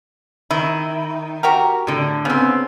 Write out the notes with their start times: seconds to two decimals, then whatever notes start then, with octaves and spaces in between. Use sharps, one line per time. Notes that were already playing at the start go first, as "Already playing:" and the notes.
0.51 D#3 E4
1.43 F#4 G4 A#4
1.87 A2 D3
2.25 C#3 B3 C4